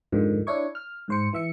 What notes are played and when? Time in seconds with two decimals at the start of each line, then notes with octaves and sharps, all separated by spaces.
0.12 F2 G#2 D3 D#3 F3
0.47 D4 E4 C#5 C#6
0.75 F6
1.08 G#2 C5 C#7
1.33 E3 E5 C#7